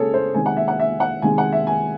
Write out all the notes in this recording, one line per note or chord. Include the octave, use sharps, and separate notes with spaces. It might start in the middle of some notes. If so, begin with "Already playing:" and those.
Already playing: C#3 G#3 G#4 A4 C#5
C5
C3 D#3 G#3 G#5
F#5
E5
F#5
E5
F#5
C3 D#3 G#3 G#5
F#5
E5
G#5